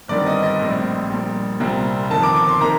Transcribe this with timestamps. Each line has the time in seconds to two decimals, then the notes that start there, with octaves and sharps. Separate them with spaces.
0.08 G1 G2 D#3 G3 C4 D5
0.26 D#5
0.43 D#5
0.59 A#1 A2 G3 C4
1.10 A#1 A#2 G3
1.60 C2 A#2 G3 C4
2.10 G1 F2 D#3 A5
2.23 D6
2.36 D6
2.49 C6
2.60 C3 D#3 A#3 A#5